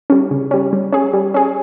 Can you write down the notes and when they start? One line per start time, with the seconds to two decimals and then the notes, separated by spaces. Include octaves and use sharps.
0.10 G3 C#4
0.31 C#3
0.51 G3 C#4
0.73 G3
0.92 C#4 G#4
1.13 G3
1.34 C#4 G#4